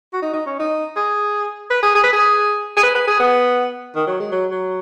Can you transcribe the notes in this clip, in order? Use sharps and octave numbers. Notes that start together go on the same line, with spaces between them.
F#4
D#4
D#4
C#4
D#4
G#4
B4
G#4
G#4
B4
G#4
G#4
B4
B4
G#4
B3
D#3
F#3
G#3
F#3
F#3